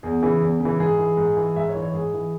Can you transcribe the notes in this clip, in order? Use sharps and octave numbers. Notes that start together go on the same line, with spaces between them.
E2 G#4
C#3 E3
E2
C#3
E3
G#2 G#4
E3
G#2
E3
G#2 E5
C#5
E3
C#5
G#2 G#4
E3